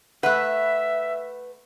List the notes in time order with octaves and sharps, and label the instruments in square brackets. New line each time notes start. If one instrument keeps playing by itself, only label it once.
[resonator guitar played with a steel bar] A3 B4 [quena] E5 [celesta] F#5 F#6